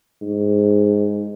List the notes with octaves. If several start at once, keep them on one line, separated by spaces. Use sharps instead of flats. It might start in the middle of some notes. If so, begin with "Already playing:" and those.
G#2